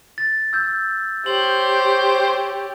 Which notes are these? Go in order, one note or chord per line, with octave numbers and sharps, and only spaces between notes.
A6
E6 G6
G4 C5 C#5 F#7